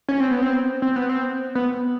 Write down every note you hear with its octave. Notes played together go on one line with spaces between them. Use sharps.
C#4
C4
B3
C4
C4
B3
C4
B3